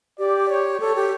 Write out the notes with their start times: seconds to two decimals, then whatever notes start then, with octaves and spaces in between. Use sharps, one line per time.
0.19 G4 D5
0.49 C#5
0.80 A4 C#5
0.95 G4